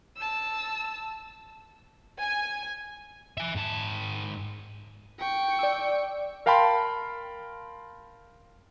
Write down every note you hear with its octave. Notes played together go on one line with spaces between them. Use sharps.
A5 E6
G#5
E5 G#5
G#2 A5
G5 C#6
D5 E6
A#4 F5 G5 A5 B5 C6